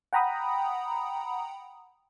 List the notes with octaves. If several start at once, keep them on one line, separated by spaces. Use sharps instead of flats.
F#5 G5 A#5 B5 D#6